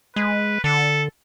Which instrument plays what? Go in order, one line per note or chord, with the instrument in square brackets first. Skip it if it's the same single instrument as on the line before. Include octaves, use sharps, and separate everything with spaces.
[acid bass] G#3 [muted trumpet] B4
[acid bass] D3 [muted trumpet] A4